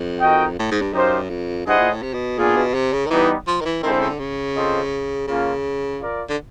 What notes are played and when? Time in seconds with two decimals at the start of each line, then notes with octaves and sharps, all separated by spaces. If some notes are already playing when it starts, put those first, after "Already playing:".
Already playing: F2
0.20 D#4 F#4 A#4 D#5 G5
0.59 A2
0.71 G#2
0.81 G2
0.93 F#2 D#4 G4 C5 F5
1.30 F2
1.66 G2 E4 G#4 C5 D#5 F#5
1.79 A#2
1.90 A2
2.03 C3
2.14 B2
2.38 A#2 B3 D4 F4 G#4
2.56 B2
2.74 C3
2.93 C#3
3.06 D#3
3.10 E3 G3 B3 D#4 G4 B4
3.47 F3
3.61 D#3
3.65 E3
3.83 D#3 G#3 C4 E4 A4 C5
3.92 D3
4.00 C#3
4.09 D3
4.19 C#3
4.55 C4 F4 A4 C5 D#5
5.27 C#3 A#3 C#4 F4
6.00 F4 A#4 D5
6.29 D3